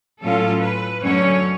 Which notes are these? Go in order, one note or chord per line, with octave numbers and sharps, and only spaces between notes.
A2 F#3 C#4 F4 A4
B4
F#2 D3 F#3 A3 C#4 C#5